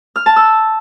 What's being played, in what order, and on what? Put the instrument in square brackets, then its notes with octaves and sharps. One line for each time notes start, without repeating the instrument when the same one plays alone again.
[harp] F6
A5
E6